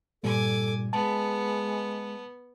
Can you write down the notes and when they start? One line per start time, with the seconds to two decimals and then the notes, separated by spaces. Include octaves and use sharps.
0.23 G2 A#2 G3 A4 G#5 D6
0.93 G#3 B3 A5